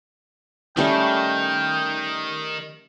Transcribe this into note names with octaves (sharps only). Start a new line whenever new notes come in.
D#3 G3 A3 C#4 G5